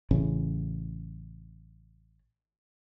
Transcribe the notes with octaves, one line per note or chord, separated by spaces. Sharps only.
A1 C#3